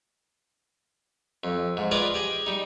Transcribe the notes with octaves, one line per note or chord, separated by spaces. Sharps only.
F2
G#2
F4 G#4 B4 D5 D#5 F5
G4 G#4 D#5
G3 D#4